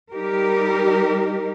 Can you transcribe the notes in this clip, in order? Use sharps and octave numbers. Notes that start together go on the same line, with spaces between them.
G3 D#4 G4 A#4